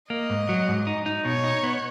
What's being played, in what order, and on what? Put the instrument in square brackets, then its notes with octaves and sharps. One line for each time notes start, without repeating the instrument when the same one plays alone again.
[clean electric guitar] A#3 [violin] D#5
[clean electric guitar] G#2
F#3
G#2
D#4
D#4
[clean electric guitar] B2 [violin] C#5
[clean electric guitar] D#4
B3